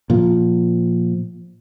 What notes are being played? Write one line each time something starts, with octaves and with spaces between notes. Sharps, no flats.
A#2 F3